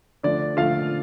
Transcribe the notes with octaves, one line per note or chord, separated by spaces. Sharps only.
D3 F3 A3 D4 D5
D3 F3 A3 F4 F5